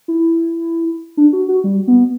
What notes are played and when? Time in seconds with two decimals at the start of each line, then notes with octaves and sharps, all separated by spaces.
0.08 E4
1.17 D4
1.33 F#4
1.48 F#4
1.64 G3
1.88 B3